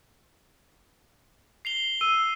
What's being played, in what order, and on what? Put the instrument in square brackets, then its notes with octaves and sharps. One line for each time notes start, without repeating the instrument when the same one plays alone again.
[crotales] C7 F7 G7
[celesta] E6 [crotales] D#7